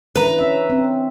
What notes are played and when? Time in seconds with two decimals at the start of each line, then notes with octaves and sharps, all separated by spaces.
0.16 E3 C#4 D4 B4 A#5
0.39 C#4 E5
0.70 C4